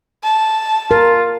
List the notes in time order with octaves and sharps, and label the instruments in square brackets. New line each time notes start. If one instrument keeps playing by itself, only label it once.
[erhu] A5
[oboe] F4 [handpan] A#4